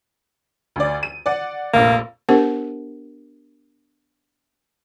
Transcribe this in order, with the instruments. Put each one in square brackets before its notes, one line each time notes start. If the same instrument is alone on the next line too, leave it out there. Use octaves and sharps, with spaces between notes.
[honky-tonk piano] D2 D5
D#7
D5 F#5
[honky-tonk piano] F1 A#1 [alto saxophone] A#3
[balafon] B3 D4 G4 A#4 C5 F#5